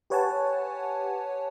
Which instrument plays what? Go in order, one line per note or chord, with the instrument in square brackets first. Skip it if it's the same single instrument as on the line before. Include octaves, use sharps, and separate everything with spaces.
[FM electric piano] G4 B4 C#5 F#5 G#5 A5